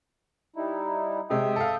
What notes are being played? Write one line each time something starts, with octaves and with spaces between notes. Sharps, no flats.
G3 D#4 E4
C3 G#3 E5 G5 D#6
A4 F5